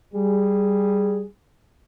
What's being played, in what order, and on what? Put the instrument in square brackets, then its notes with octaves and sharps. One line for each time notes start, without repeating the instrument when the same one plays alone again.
[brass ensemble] G3 G#4